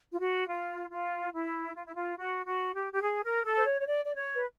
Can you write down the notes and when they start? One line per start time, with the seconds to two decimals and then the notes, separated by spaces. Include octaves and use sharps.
0.13 F4
0.20 F#4
0.48 F4
0.91 F4
1.33 E4
1.75 F4
1.85 E4
1.95 F4
2.17 F#4
2.46 F#4
2.74 G4
2.92 G4
3.02 G#4
3.24 A#4
3.44 A4
3.57 C5
3.66 C#5
3.81 C#5
3.87 D5
4.04 D5
4.15 C#5
4.35 B4